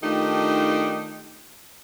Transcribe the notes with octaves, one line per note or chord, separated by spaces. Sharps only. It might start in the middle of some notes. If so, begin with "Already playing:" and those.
D#3 A3 D4 D#4 F4 G4